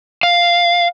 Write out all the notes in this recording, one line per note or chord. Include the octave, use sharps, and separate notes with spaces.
F5